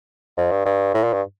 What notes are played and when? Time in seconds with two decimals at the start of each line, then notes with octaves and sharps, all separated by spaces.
0.37 F2
0.51 G2
0.65 G2
0.94 A2
1.04 A#2
1.13 G2